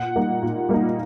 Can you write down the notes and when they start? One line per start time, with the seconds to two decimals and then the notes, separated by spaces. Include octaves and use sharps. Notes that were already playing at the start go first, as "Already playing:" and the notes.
Already playing: A#2 F#5
0.16 G3 A#3 D#4
0.43 A#2
0.69 G3 A#3 D#4